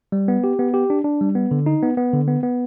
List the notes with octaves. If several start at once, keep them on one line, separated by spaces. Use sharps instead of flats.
G3
B3
G4
B3
G4
D4
D4
G3
B3
D3
D#4
B3
B3
D3
B3
B3